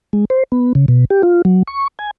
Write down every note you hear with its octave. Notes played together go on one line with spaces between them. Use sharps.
G#3
C5
B3
C#3
B2
G4
F4
F#3
C#6
G#5